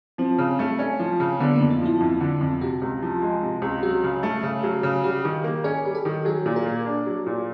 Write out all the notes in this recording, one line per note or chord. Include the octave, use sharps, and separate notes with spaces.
F3 C4
C#3
A3
C#4
F3
C#3
D3 B3
A#3
F2
D#4
F3 E4
F2
D3
F2
C3 F#4
C#2
F3
G#3
C3
C#2
F#3 F#4
C#3
A3
C#3
F#3
C#3
G3 F#4
D#3
A#3
C#4 G#4
G3
A4
D#3
F#3 G#4
A#2
A#4
A#3
D4
F#3
A#2